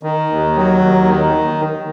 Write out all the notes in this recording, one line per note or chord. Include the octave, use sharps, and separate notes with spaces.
D#3
D#2
F#3
D#2
D#3